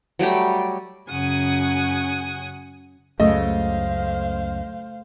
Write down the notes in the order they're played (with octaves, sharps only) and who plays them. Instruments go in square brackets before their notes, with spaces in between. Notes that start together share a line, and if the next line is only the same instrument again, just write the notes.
[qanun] F#3 G3 A3 G4
[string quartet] F#2 C#3 F#5 G#5 D#6
[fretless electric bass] C#2 F#2 C#3 [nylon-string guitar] A3 [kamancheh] C5 F5 [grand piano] D#5